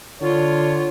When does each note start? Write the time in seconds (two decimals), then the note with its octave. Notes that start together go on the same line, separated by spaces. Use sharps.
0.22 D3 F4 C#5